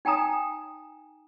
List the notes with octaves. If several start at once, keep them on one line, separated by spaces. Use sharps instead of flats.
D#4 G5 G#5 A#5 D#6